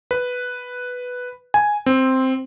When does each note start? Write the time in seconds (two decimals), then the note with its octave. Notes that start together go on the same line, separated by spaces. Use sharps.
0.11 B4
1.54 G#5
1.86 C4